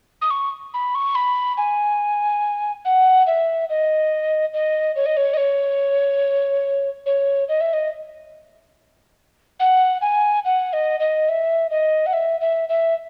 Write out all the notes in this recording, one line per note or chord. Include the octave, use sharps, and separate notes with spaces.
D#6
C#6
B5
C#6
B5
G#5
F#5
E5
D#5
D#5
C#5
D#5
C#5
D#5
C#5
C#5
D#5
E5
D#5
F#5
G#5
F#5
D#5
D#5
E5
D#5
F#5
E5
E5
E5